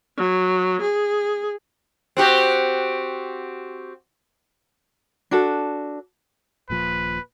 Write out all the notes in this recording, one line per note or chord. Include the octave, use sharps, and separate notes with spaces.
F#3
G#4
C4 F#4 G4
D4 F#4 A4
D#1 A#2 F3 B4